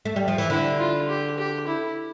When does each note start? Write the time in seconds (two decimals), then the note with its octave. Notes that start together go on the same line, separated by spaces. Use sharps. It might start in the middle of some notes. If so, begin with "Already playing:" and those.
0.05 A3
0.16 G3
0.28 F3
0.38 E3
0.50 D3 E4
0.79 F4
1.08 G4
1.38 G4
1.67 E4